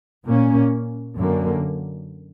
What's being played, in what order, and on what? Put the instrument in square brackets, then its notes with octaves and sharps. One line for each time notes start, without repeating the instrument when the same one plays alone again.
[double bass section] A#2 A#3 C#4
F#2 D3 A#3